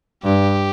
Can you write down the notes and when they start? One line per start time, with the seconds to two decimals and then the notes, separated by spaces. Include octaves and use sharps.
0.24 G2 G4